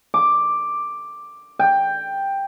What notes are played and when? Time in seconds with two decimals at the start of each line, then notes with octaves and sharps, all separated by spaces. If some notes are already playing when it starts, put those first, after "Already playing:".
0.14 D6
1.59 G5